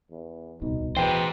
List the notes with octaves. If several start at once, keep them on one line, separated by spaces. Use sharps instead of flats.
E2
D1 C2 B2 D#4
B2 E3 G#4 B4 C5 G5